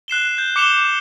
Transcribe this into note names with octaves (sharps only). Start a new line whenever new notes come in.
F#6 C7 E7 G7
G6
D6 C#7 E7 F7 G7